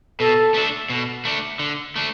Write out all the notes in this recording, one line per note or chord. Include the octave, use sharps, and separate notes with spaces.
B2 A4
A3 D4
B2
A3 D4
D3
A3 D4